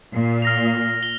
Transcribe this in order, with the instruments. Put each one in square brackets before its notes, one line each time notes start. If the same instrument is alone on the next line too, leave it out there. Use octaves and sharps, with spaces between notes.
[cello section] A#2
[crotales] F6 A#6 F7
G7